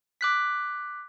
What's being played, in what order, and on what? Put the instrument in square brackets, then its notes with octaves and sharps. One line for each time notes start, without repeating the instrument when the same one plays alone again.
[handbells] D6 F#6 B6